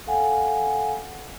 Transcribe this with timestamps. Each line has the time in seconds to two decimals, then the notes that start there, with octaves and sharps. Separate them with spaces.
0.07 A4 F5 F#5 G#5